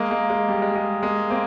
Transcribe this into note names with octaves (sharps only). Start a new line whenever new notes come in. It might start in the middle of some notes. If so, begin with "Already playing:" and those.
Already playing: G#3 A#3
G#3 A#3
G#3
G3
G#3
G#3
G#3 A#3
A#3 C4